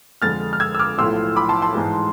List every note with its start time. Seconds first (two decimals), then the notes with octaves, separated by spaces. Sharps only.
0.22 F2 D3 G#3 F6 A6
0.53 F6
0.60 E6 G#6
0.75 E6
0.79 D6 F6
0.98 B1 A2 F3 A3 E4 C6 E6
1.36 B5 D6
1.49 A5 C6
1.62 A5 C6
1.74 G#2 E3 G#3